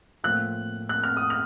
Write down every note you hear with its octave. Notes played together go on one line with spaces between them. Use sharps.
A2 F3 A#3 F#6
F#6
F6
D#6
F6